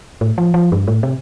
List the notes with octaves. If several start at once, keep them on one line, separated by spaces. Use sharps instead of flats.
A2
F3
F3
G2
A2
C3